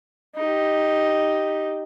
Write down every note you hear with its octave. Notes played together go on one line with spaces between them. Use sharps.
D#4 G4